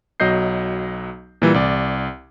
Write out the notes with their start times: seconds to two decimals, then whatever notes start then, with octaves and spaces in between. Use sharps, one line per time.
0.20 B1 F#3 D#5 G6 C7
1.42 A#2 E3 G3
1.54 C2 D5